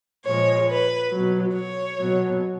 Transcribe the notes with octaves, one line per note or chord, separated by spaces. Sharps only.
A#2 F3 G#3 C#5
B4
B2 F#3
C#5
B2 F#3